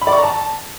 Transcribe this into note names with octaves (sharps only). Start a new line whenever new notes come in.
B5
D5
C#6
A#5
A5